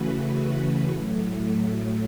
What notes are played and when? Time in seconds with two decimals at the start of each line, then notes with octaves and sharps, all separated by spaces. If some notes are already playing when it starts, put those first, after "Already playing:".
Already playing: C#3 E3 A3 F#4 B4
0.88 A2 F#3 A3